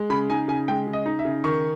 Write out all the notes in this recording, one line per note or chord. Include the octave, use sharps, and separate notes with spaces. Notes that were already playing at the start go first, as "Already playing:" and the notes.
Already playing: G#3
C#3 B5
D#4 G#5
C#3 G#5
G#3 G5
C#3
D#5
D#4
E5
C#3
D#3 C#6